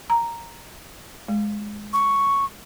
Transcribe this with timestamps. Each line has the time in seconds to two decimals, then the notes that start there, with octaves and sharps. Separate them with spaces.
0.10 A#5
1.28 G#3
1.93 C#6